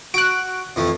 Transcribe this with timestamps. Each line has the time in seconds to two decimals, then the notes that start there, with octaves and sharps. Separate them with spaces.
0.14 F#4 F#6 D7
0.76 F2 E3 A3